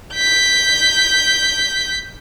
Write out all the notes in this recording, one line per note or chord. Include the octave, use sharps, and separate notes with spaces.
G6 B6